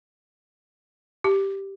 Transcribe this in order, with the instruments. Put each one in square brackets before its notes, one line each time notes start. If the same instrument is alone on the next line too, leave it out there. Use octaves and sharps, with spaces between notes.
[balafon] G4